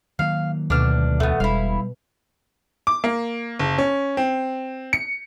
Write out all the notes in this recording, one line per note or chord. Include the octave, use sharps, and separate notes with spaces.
D#3 F#3 A#3 F5
D2 B2 D4 F#4 F6 B6
E1 A3 B3
E1 G3 E4 F5
D6
A#3
F#1
C#4
C4
C#7